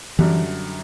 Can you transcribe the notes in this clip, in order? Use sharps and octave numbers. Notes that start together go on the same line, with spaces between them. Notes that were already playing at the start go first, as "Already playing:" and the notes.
F#2 D3 E3 G3